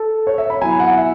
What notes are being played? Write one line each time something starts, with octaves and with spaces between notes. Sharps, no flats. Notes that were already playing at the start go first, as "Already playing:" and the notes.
Already playing: A4
C#5
E5
B5
F#3 B3 E4 G#5
F#5
E5